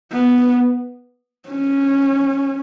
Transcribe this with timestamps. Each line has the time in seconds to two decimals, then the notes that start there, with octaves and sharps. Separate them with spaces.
0.12 B3
1.48 C#4